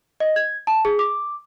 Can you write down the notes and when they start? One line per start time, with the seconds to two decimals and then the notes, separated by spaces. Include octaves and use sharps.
0.20 D#5
0.36 G#6
0.67 A5
0.85 G#4
0.99 D6